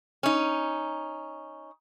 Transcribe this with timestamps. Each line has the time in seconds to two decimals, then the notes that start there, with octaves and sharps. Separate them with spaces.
0.23 C#4 D#4